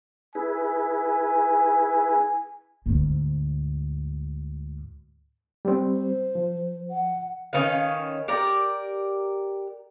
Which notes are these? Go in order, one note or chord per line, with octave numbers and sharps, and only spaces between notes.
E4 G#4 B4 G#5
D2 G#2
G3 C4
C5
F3
F#5
D#3 C#4 B4 F5
G4 A#4 D5